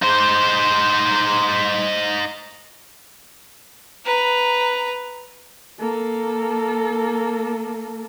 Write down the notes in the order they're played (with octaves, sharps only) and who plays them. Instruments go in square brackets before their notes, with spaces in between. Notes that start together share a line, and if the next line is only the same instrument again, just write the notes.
[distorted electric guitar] D#4 C5
[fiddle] B4 A#5
[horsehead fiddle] A#3 A4